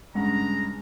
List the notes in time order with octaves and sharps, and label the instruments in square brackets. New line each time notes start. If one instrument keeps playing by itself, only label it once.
[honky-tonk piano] G2 C#3 [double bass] G#3 [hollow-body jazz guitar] C#4 F#5 [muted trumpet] A#5